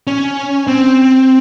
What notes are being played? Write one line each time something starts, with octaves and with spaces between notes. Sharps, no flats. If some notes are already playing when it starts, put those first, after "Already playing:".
C#4
C4